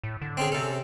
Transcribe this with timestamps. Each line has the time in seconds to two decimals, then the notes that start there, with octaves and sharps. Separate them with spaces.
0.03 A2
0.22 D3
0.37 C4 C#4 G#4
0.52 C3 C#4 A4